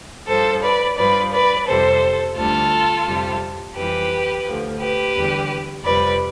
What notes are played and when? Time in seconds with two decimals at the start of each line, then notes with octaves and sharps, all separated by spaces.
0.27 G2 F3 A4 C5
0.63 B4 D5
0.97 G2 F3 B4 D5
1.33 B4 D5
1.67 F2 C3 G3 A4 C5
2.36 D2 D3 G3 F4 A4
3.06 F2 C3 G3
3.76 F2 E3 G3 G4 B4
4.45 D2 D3 F3
4.80 G4 B4
5.15 E2 D3 G3
5.85 F2 C3 G3 B4 D5